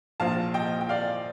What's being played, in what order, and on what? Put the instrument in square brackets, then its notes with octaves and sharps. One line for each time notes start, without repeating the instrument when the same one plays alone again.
[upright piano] A#1 A#2 F3 F5 A5
D#5 G5
G5
D5 F5